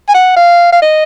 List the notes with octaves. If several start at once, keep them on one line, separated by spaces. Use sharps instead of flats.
G#5
F#5
F5
F5
D#5